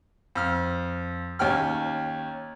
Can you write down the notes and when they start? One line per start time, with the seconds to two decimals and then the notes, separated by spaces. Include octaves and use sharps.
0.35 F2 F6
1.39 D#2 C#4 G5 F6